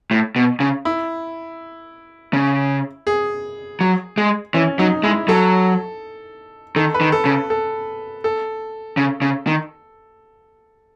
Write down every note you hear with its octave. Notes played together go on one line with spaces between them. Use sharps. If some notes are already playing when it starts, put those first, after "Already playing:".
A2
B2
C#3
E4
C#3
G#4
F#3
G#3
E3 C#4
F#3 D#4
G#3 E4
F#3 A4
D#3 A4
B4
D#3
A4
C#3
A4
A4
C#3
C#3
D#3